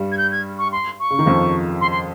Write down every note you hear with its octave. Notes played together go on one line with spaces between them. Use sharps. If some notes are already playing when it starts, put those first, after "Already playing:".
Already playing: G2 G3
G#6
G6
G#6
C#6
C6
C#6
C#3
D#3
F2 F3
C6
C6